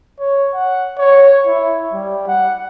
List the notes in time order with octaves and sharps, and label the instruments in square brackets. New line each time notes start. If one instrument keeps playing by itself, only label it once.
[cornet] C#5
F#5
C#5
E4
G3
F#5